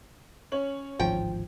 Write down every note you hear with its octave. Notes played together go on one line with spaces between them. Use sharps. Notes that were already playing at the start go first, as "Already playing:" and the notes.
C#4 C#5 F#7
D1 G#1 F3 G5